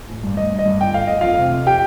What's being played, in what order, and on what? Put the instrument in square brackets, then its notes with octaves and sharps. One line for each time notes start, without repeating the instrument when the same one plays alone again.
[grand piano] A1
G2
G2 D#5
G2
D#5
G2
G1 G5
A3 F5
A3 D#5
F2 F4 F5
C3
F2
G4 G5